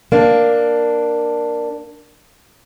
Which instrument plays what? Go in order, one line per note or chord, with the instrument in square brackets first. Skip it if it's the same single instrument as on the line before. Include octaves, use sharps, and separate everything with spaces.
[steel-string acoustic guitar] A#3 D4